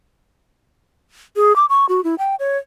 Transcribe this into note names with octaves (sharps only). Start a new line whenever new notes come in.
G#4
D6
C#6
F#4
E4
G5
C#5